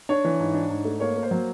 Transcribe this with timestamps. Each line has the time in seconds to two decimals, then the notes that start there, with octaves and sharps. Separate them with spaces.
0.09 D4 C#5
0.25 E3
0.40 G#2
0.54 D4
0.70 G#2
0.85 A3
1.00 A#3 C#5
1.16 A#3
1.23 C5
1.31 F#3